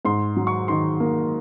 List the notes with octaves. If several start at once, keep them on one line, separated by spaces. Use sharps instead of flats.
G#2 C6
F#3
C#6
D#3 C6
A#3